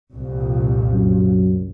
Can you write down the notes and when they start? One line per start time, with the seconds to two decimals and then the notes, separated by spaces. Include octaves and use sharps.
0.13 C2 F2 A#2
0.91 F#2